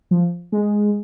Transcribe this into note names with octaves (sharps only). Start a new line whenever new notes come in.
F3
G#3